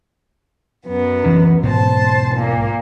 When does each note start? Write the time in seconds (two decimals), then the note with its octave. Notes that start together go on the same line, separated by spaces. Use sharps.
0.87 F#2 B3
1.24 D2 E3 C#4
1.63 B1 G#2 B3 C5 A5
2.35 A#2 A#3